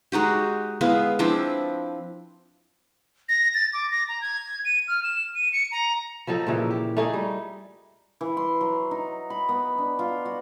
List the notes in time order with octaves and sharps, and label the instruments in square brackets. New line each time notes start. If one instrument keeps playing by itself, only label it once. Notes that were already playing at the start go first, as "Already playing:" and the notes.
[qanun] G#3 D#4 F#4 G4
G#3 B3 E4 F5
F3 C4 D4 E4
[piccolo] A#6
A6
D6
A#6
A#5
G#6
D#7
F6
E7
D#7
C#7
A#5
[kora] F3 F#3 D#4 A4
A#2 C#3 E3
G4
A3 D#4 G#4
G3
[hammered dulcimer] E3
C6
F#3
D#4
B5
B3
D4
F4
F#4